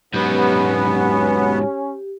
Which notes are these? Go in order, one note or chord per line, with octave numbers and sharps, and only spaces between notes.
G#2 F#3 B3 C#4 G4